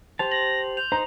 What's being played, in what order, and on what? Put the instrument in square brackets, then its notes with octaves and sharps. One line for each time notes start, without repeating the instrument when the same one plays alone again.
[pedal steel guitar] G4 C5 A5 [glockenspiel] C6 F7
[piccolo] A#6 [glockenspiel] F#7
[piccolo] G6 [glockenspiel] F7
[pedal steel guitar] D#4 C5 [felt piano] A#5